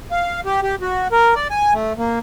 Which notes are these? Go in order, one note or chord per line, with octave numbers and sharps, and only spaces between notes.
F5
G4
G4
F#4
A#4
D5
G#5
A3
A#3